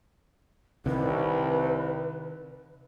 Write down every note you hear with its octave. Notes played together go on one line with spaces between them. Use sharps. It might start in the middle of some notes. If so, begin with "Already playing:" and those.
C2 C3 D#3 B4